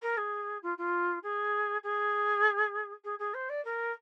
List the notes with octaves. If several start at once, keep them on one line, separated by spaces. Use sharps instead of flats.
A#4
G#4
F4
F4
G#4
G#4
G#4
G#4
C5
D5
A#4